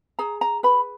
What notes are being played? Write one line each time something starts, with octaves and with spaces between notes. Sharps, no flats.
G#4 A#5
A#5
B4 B5